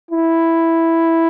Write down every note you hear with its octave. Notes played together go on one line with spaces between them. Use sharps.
E4